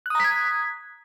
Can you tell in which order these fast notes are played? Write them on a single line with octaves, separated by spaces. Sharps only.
F#6 D#6 A#5 B6 G#6